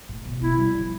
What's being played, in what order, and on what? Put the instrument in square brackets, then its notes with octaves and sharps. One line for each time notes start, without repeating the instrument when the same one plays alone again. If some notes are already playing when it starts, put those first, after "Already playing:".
[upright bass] A2
B2
[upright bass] B2 [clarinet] E4
[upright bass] G3
F3